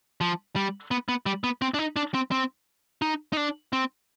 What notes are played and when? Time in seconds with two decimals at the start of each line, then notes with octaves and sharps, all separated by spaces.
0.21 F3
0.56 G3
0.91 B3
1.09 B3
1.26 G3
1.44 B3
1.62 C4
1.74 D4
1.79 D#4
1.96 D4
2.14 C4
2.31 C4
3.02 D#4
3.33 D#4
3.37 D4
3.73 C4